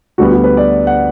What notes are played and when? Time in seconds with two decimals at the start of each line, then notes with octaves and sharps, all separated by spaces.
0.18 D2 D3 G3 B3 F#4
0.32 F#4
0.44 B4
0.57 D5
0.87 F#5